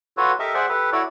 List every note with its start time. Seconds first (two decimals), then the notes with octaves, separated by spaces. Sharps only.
0.17 F4 F#4 A4 B4 C#5
0.40 G4 A4 A#4 D#5 E5
0.54 G#4 C5 D5 E5 F#5
0.69 G4 A4 B4
0.92 E4 F#4 A4 C#5 D5